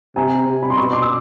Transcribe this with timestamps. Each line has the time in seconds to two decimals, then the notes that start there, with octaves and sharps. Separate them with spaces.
0.16 C3 G#5 A#5
0.47 C3
0.63 B5
0.70 C6
0.77 B2 B5 C#6
0.93 C6 D6
1.02 E6